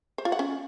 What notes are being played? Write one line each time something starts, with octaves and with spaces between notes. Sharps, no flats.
C5
F4
F#5
C#4